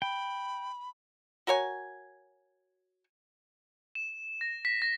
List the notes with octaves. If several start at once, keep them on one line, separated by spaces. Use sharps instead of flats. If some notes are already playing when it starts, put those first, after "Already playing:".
G5 B5
F#4 A#4 C#5 G#5
E7
A#6
B6
A#6